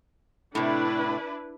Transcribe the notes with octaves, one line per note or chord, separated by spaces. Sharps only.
A2 C3 D4 E4 B4